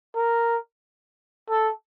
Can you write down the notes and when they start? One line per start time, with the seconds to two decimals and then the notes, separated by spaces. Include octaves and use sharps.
0.16 A#4
1.50 A4